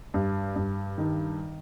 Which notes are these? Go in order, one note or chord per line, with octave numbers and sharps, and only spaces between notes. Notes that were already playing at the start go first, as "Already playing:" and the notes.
G2
G2
D#3